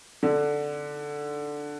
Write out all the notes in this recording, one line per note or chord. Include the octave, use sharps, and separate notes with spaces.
D3